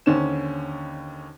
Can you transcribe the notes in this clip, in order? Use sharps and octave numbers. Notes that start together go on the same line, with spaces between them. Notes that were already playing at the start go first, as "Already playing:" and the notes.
D#2 D3 C#4 C5 E7